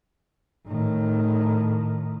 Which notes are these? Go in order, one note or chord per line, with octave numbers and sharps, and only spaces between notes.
A2 D#3